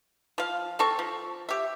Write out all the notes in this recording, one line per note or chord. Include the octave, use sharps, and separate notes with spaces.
F3 F5
C4 A4 C#6
F3
G4 E5